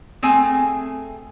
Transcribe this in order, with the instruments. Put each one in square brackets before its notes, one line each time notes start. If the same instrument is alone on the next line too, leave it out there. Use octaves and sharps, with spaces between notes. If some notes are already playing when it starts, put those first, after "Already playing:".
[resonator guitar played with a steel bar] A3 C4 G#4 G#5